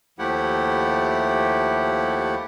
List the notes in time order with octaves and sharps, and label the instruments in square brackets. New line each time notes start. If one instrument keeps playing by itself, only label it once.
[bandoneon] D#2 F3 A3 E4 G4 F#5